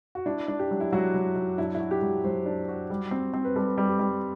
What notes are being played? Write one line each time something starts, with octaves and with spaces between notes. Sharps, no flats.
F#4
D4 E4
D4
G4
F#3
E4
F#3 F#4
F#3
F#3
D4 E4
E4
F#4
G4
F#3
F#3 C5
D4
F#4
G3
C4
C4
B4
G3 A4
G3
G4
G3